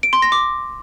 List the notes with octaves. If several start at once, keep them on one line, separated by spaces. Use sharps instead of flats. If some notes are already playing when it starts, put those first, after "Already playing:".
D7
C6
A#6
D6